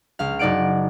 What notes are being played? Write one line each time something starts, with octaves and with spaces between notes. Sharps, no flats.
C#2 F5
F#1 D#4 D5 F#5 D7